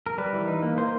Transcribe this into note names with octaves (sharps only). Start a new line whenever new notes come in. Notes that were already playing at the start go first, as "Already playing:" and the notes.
A#4
G3 B4
E3
D#4
A#3
A#3 C5